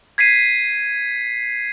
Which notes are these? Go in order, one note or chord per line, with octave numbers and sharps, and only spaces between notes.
G#6 B6 C7 D#7